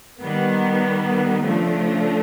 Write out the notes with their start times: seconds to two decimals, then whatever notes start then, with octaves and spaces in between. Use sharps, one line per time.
0.21 D#3 G3 B3
1.44 C#3 F3 A3 D4